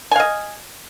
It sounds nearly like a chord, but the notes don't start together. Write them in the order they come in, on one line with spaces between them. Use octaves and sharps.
G#5 F5 D#5